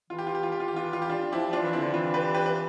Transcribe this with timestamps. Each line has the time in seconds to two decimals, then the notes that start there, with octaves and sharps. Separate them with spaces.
0.10 E3 F4
0.18 G4
0.27 F4
0.35 G4
0.43 F4
0.52 G4
0.60 F4
0.68 E3 G4
0.76 F4
0.85 G4
0.93 F4
1.02 G4
1.09 D4 F4
1.32 F3 E4 G4
1.48 F3
1.53 D4 F4
1.63 E3
1.69 D4
1.73 C4 E4
1.79 D3
1.94 E3 D4 F4
2.14 G4 B4
2.34 G4 B4
2.46 B4